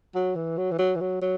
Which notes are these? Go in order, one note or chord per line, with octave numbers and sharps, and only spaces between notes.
F#3
E3
F#3
E3
F#3
E3
F#3
F#3